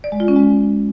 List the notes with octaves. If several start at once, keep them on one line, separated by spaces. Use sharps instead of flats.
D5
G#3
F4
C#4
G#3